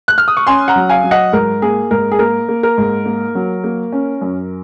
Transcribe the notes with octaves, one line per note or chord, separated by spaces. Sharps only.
F#6
F6
D#6
C#6
C#4 G#5 C6
F#5 A#5
F#3
F5 G#5
F#3
D#5 F#5
G#2 A#4
A#3 G#4
G#2 A#4
G#4
A#3 A#4
A#3
A#4
G#2
A#3
F#3
A#3
C#4
F#2